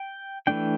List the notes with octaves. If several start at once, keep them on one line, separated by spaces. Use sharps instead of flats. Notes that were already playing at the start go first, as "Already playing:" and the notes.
Already playing: G5
E3 A3 D4 G5